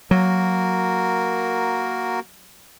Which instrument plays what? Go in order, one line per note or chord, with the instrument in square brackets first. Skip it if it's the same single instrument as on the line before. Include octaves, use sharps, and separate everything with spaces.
[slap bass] F#3 [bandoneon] A#3 F#4 A#4